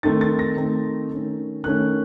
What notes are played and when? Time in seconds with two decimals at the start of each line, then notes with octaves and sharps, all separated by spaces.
0.03 D#3 A3 C4 D#4 A6
0.21 A6
0.39 A#6
0.57 D#3 A3 C4 D#4
1.10 D#3 A3 C#4
1.64 D#3 A3 C#4 F#6